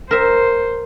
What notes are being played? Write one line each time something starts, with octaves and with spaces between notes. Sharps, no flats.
A#4 C5 E5